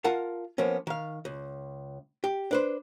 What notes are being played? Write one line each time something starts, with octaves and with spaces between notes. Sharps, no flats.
F4 A#4 F5 F#5 A5
F3 A#3 B3 C#4
D#3 F5
C#2
G4
D4 B4 C5